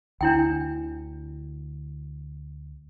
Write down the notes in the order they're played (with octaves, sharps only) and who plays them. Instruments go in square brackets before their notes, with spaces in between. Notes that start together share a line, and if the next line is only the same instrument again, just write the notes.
[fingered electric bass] D2 D3 [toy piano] D4 E4 G5